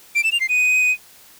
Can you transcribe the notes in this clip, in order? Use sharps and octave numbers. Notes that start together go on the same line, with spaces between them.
D7
E7
F7
C7
D#7